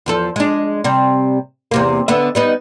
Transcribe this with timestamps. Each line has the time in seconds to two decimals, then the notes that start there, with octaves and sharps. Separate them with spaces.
0.06 E2 F3 A4
0.36 G#3 D4
0.84 C3 G3
1.71 E2 C3 A#3
2.08 D3 B3 E5
2.35 G3 B3 D#4